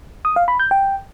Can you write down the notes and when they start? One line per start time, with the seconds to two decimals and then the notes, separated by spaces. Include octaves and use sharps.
0.25 D#6
0.36 F5
0.48 B5
0.60 G6
0.71 G5